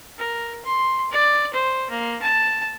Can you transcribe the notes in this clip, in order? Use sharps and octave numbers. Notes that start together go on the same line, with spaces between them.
A#4
C6
D5
C5
A#3
A5